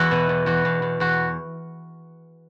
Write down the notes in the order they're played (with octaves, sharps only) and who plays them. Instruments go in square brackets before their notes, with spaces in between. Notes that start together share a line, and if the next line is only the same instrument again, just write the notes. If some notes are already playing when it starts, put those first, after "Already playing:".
Already playing: [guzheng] E2 E4 F#4
B2
E2
E2 F#4
E2
E2
E2 F#4